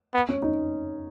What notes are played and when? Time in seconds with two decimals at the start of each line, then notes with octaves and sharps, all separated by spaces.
0.14 B3
0.29 C#4
0.42 D#4